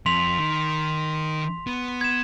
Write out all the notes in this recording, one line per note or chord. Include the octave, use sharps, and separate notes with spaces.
F2 C6 B6 F7
D#3
B3
G#6 E7